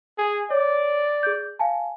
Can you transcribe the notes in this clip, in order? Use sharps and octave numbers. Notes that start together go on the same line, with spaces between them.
G#4
C#5 D5
G#4 G6
F5 G#5 A5